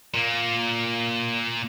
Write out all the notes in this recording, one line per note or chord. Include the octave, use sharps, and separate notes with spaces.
A#2 A#3